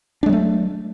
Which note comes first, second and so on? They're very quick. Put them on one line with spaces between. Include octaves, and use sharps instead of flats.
D4 G#3 F#3 A3